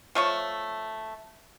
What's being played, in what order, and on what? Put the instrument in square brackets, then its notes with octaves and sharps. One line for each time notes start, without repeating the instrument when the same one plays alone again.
[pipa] F3 A3 C#5 E5